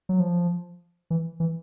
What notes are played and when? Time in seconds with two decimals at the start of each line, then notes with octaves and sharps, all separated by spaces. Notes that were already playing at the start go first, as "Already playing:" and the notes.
0.09 F#3
0.20 F3
1.10 E3
1.40 E3